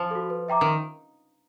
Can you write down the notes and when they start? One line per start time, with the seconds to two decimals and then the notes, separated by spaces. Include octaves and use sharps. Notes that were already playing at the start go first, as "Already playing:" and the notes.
Already playing: F3
0.11 F#4 A4
0.30 B4
0.48 E5 G5 A#5 D6
0.61 D#3